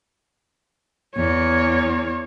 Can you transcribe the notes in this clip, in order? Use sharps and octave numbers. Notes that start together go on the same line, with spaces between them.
E2 C#5